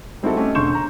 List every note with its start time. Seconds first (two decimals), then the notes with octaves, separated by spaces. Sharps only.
0.23 G3 C4 D#4 E4 F#4 A4
0.37 A3 C#4 G4 D#5
0.55 E1 D3 C6 C#6 G6 E7
0.75 A#5